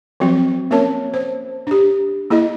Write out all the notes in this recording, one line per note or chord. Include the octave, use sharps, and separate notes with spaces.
F3 F#3 C4 F#4
A#3 C#4 F#4 A#4 C#5 A5
C5
D4 G4
A#3 E4 G#4 D#5